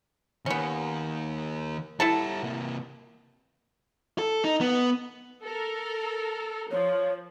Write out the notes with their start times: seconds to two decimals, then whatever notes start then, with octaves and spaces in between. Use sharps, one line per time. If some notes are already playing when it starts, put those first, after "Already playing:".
0.46 D#3 A#3 B3 C#4
2.00 G3 E4 A4 F#5 A5
2.43 C3 A#3
4.19 A4
4.44 D#4
4.61 B3
5.43 A4 A#4
6.71 F3 C#5